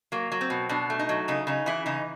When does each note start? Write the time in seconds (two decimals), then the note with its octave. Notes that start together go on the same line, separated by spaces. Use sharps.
0.12 F#3 A#3
0.32 F#3
0.41 C4
0.50 B2
0.69 B2 D4
0.90 A3
0.99 D#4
1.09 F#3
1.28 C#3 D#4
1.47 C#3 D#4
1.66 E3 E4
1.86 C#3 D#4